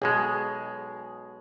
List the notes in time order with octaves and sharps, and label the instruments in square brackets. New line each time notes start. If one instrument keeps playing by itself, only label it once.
[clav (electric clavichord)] B1 B2 G#3 [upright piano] G#4